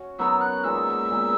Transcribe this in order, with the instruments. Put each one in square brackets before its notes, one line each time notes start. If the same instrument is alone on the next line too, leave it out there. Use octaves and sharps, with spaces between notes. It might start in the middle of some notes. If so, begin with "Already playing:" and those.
Already playing: [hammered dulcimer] C#4 F#4
[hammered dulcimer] F#3 B3 D#4 A#4 [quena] E6
[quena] F#6
[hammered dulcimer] A#2 G#3 B3 D#4 [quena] E6
[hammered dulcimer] A#2 G#3 B3 D#4